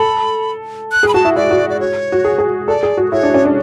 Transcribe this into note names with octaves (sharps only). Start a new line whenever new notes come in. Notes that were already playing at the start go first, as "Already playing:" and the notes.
Already playing: A4 B5
F#6
G#4
B5
F#4 A5
E4
E4 D5
F#4
D5
C#5
F#4
G#4
G#4
A4 D5
G#4
F#4
E4 C#5
D4
C#4
D4